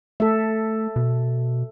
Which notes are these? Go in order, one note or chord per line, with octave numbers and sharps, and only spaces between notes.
A3 A4 E5
B2